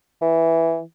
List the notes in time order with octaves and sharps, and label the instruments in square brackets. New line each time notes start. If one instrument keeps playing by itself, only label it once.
[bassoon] E3